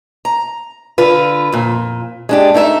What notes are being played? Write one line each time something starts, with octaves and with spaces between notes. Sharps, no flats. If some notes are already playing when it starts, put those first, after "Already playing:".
A#5
D3 F4 B4
F2 A#2
G#3 D4 G4
A3 D#4 A4 E5